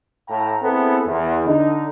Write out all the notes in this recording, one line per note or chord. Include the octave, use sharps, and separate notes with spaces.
A2 F5 G5 A5 A#5
B3 C4 E4 G#4 A4
E2
D3 D#4